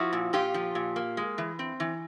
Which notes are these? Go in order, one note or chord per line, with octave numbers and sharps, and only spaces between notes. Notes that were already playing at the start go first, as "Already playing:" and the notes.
Already playing: F3 E4 F#4
A#2
A#2 F4 G4
F3
A#2
A#3
G#3
E3
C4
E3